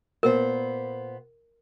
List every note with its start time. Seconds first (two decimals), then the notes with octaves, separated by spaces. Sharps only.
0.23 A#2 B3 A#4 C5